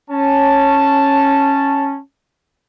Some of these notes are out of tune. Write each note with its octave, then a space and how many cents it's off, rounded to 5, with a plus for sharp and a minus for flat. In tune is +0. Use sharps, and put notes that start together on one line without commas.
C#4 -10 A5 +0